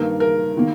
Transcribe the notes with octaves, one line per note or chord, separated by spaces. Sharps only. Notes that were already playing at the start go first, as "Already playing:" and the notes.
Already playing: G2 D#3 A#3 A#4
A#4
D#3 A#3